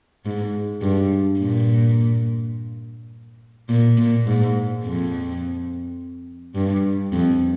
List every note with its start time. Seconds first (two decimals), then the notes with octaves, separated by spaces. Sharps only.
0.25 G#2
0.82 G2
1.39 A#2
3.69 A#2
3.97 A#2
4.26 G#2
4.84 F2
6.55 G2
7.13 F2